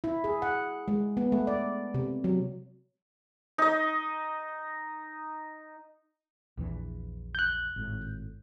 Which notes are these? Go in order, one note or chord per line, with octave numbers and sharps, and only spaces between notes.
E4
G#4
F#5
G#3
B3
A3
D5
C3
F#3
D#4 D#5
A#1 E2 E3
F#6 G6
G#1 A2